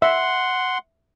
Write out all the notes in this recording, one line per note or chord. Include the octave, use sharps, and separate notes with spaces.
E5 F#5 C6